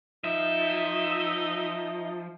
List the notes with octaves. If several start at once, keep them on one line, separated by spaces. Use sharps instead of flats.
F3 D#4 E5